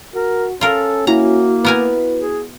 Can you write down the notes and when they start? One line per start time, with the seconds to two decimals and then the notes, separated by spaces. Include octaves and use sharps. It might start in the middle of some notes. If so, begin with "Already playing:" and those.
0.14 F#4 A#4
0.61 C#4 F4 A4 A#4
1.07 A#3 E4 F#4 A#5
1.65 B3 A#4 B4 G#5
2.19 G#4